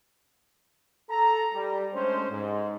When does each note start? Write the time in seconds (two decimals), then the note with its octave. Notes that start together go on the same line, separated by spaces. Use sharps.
1.10 A4 A#5
1.54 G3
1.93 G#3 A3 C#4 D4 C5
2.31 G#2